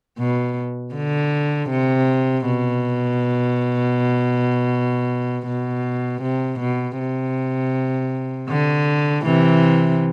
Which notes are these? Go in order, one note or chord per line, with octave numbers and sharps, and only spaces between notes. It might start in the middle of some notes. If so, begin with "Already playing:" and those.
B2
D3
C3
B2
B2
C3
B2
C3
D3
C3 E3